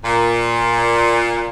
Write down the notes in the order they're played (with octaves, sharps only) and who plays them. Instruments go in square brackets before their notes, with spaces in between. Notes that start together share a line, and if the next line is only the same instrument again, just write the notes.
[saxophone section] A#2